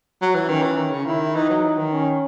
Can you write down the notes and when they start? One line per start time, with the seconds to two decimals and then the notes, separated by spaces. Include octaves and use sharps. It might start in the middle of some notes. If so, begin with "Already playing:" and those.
0.22 F#3
0.35 E3
0.48 D#3 C#4
0.62 E3
0.77 D#3
0.91 C#3
1.06 D#3 E4
1.35 E3 D#4
1.50 F#3
1.64 E3
1.78 D#3
1.92 C#4